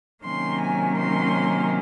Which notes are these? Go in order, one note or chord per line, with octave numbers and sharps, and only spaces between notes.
C3 D#3 F#3 A#3 C#4 C6
G#5
C6